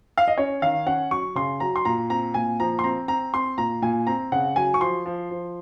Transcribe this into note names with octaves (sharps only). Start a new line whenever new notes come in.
F5
D#5
C#4 C#5
D#3 F5
C#4 F#5
F#3 C#6
C#3 C6
F#3 A#5
C6
A#2 A#5
C4 A#5
A#2 G#5
F3 A#5
C6
C4 A#5
C4 A#5
C4 C6
A#2 A#5
A#2 G#5
C4 A#5
C#3 F#5
F#3 G#5
C#6
F3 C6
F3
F3